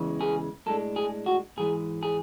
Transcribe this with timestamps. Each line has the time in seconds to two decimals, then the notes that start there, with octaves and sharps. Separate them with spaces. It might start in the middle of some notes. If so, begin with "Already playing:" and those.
Already playing: E2 C#3 E3 G#3
0.21 G#4
0.66 A2 G#3 D4 A4
0.96 G#4
1.26 F#4
1.57 G#2 E3 G#3 G#4
2.03 G#4